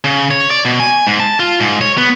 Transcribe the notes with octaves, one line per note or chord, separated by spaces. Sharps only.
C#3
C#5
D5
B2
G#5
G#2
A5
F4
G#2
C#5
B3